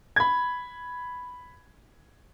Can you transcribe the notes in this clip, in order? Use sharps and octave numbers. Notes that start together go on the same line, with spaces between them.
B5 G#6